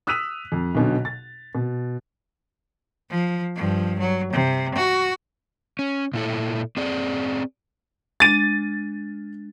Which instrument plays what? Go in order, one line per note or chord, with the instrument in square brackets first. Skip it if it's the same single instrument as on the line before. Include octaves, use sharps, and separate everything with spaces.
[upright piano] D#6 E6 F#6 B6 D#7 F7
F2
B1 B2 D3
A6
B2
[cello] F3
G2 F3
F#3
C3
F#4
[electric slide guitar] C#4
A#2 E4 A4
C4 G#4 D5
[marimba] G#3 D4 [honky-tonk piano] A6 D#7